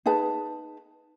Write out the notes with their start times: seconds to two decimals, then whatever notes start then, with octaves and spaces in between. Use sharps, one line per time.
0.06 D#4 G#4 B4 A5